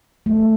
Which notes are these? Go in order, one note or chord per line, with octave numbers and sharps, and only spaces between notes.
A3